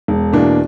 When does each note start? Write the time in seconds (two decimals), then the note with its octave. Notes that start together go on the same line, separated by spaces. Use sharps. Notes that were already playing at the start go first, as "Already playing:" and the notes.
0.08 E1
0.33 E2 B2 A#3 D4